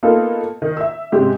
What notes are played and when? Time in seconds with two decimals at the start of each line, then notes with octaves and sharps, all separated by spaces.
0.03 A#3 B3 D#4 F4 A4
0.62 D#3
0.77 E5 E6
1.12 G#2 C3 G#3 C#4 G4